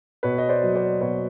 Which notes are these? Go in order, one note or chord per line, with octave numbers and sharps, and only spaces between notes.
B2 B4 C#5
D#5
C5 D5
F#3
C5 D5
B2 B4 C#5